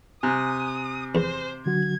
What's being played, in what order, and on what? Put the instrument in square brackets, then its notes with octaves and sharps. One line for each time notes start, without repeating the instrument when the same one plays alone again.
[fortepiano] C3 [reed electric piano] G#5 A#5 F#6 [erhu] D#6
[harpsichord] E2 [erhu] C5
[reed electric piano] D3 F#3 F#4 [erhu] G#6